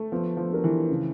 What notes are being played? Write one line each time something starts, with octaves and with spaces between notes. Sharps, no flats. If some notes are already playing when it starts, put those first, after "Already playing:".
Already playing: A3
F3 B3
F3
D4 G4 A#4
E3
C#3